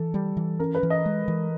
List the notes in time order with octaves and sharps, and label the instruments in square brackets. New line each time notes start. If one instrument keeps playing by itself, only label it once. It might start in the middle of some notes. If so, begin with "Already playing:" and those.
Already playing: [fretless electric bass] E3 [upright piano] A4
[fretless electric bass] G3
E3
[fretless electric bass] C#4 [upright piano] A#4
[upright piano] B4
[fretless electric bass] E3
[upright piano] D#5
[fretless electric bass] G#3
E3